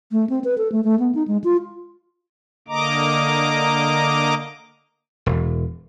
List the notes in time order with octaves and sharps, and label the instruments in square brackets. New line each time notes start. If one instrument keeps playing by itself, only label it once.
[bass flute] A3
C4
B4
A4
A3
A3
B3
D#4
G#3
F4
[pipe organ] D3 A#3 D#5 A#5 D6
[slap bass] E1